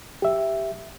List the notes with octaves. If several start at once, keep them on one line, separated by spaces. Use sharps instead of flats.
G4 E5